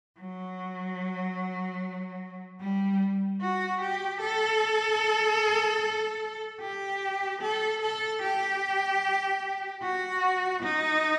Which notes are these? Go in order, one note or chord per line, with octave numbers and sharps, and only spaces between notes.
F#3
G3
F#4
G4
A4
G4
A4
A4
G4
F#4
D#4